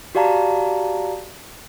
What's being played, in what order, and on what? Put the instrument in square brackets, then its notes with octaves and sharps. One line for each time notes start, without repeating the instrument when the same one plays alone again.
[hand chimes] F#4 G4 D5 F5 A5 A#5